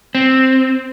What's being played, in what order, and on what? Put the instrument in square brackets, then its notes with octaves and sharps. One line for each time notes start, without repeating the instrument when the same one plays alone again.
[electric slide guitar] C4